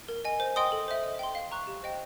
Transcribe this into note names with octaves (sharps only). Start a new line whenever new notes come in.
A#4
D#5 G#5
C5
D#5 G5 C6 D#6
A4
C5 E5
D#5
G5 C6
F5
A#5 C#6 F#6
G4
C5 D#5 G5